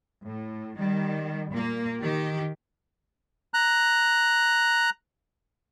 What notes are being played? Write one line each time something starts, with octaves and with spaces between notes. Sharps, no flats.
A2
D#3 G3
A#2 A#3
D#3 G4
A#5 F#6